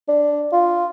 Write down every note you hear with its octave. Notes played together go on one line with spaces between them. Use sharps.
D4
F4